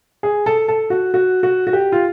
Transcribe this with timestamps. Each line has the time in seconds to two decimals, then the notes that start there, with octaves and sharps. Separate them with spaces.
0.23 G#4
0.46 A4
0.68 A4
0.90 F#4
1.14 F#4
1.43 F#4
1.67 F#4
1.73 G4
1.92 F4